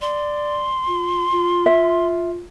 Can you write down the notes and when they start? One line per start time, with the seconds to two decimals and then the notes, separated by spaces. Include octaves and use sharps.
0.02 D5 C6
0.89 F4
1.33 F4
1.66 E5